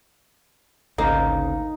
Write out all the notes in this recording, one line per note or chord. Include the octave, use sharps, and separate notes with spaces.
G#1 D2 C#3 A#3 D#4